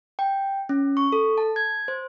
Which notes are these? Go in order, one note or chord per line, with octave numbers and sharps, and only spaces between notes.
G5
C#4
C#6
A4
A5
G#6
C5